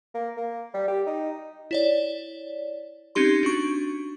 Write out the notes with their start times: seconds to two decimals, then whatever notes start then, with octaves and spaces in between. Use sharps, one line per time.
0.15 A#3
0.37 A#3
0.74 G3
0.88 G4
1.07 D#4
1.71 E4 C#5 D5
3.15 C4 C#4 D#4 G4 C6
3.43 D4 F#4 C#6